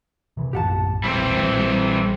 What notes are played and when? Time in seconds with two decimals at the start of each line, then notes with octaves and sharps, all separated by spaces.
0.37 C3 E3
0.53 A#1 F#2 A2 G4 F#5 A5
1.04 E1 A#1 E3 G3 C4
1.37 A#1 F#3
1.57 G3